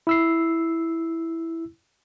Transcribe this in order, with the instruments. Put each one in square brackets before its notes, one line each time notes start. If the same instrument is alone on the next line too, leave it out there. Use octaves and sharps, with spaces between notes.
[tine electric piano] E4 E6 C7